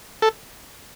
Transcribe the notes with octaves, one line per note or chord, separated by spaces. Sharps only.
A4